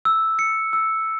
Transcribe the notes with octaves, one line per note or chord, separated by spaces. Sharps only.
E6
C#7
E6